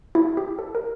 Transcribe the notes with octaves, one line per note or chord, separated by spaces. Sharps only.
E4
G4
A4
A#4